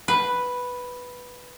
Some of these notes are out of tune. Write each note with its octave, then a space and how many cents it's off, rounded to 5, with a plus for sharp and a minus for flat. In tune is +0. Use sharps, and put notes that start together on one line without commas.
B4 +0